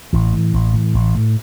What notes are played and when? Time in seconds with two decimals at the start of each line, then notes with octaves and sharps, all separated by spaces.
0.13 A1 E3
0.33 A2
0.53 A1
0.73 A2
0.94 A1
1.15 A2